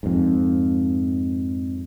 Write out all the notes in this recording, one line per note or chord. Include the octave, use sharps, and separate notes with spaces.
F2 G#2